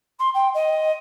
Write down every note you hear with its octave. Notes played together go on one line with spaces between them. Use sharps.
C6
G5
D#5